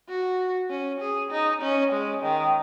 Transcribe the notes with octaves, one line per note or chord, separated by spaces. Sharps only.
F#4
C#4
G#4
D#4
C#4
G#3
D#3